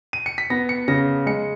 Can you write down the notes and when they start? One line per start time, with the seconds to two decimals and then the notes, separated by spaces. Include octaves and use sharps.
0.13 D#7
0.26 C#7
0.38 B6
0.50 B3 A#6
0.69 C#7
0.88 C#3 A#6
1.26 G#3 C#7